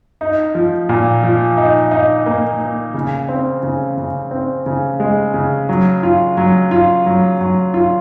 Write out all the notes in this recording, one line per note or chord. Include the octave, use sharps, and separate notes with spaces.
D#4
F3
A#2
F3
D#4
D#4
A#3
A#3
C#3
C4
C#3
C#3
C4
C#3
G#3
C#3
F#3
F4
F#3
F4
F#3
F#3
F4